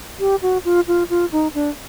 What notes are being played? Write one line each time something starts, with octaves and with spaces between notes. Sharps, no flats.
G4
F#4
F4
F4
F4
D#4
D4